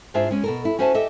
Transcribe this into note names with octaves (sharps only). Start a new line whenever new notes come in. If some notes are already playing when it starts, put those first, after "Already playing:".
G#2 D4 F4 G#4 C5 E5
G#3 C#4
B2 A4 A#4
E4
C#4 F#4 C5 E5 G#5 A5
G4 A4 D#5 E5